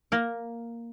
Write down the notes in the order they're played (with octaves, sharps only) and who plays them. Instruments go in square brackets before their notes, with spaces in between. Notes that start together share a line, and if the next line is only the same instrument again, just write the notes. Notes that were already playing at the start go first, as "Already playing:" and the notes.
[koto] A#3 A#4